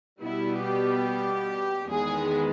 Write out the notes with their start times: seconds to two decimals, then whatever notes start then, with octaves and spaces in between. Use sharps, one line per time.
0.21 B2 G3 B3 E4
0.64 G4
1.89 E2 D#3 G#3 B3 G#4